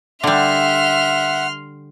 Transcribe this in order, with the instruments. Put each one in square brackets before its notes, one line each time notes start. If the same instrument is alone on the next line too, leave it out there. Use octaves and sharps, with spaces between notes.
[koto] D3 G3 [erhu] E5 [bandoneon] F#5 [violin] C6 F6